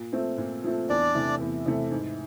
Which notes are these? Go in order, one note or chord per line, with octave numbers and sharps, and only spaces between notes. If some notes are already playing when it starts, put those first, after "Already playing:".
Already playing: A#2
F3 A3 C4
A#2
F3 A3 C4
E2 D4 D5
C3 E3 A3
E2
C3 E3 A3
G#2